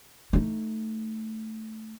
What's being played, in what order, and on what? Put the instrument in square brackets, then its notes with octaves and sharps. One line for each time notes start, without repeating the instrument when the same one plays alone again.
[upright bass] A3 D#4